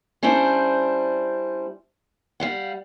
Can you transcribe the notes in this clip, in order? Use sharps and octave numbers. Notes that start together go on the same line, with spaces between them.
G3 C#4 D4 E4 C5
G3 F5 F#5